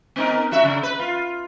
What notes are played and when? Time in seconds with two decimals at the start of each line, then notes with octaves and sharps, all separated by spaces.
0.16 B3 D#4 A#4
0.51 F#2 F#4 E5
0.63 C#3
0.83 B4
0.99 F4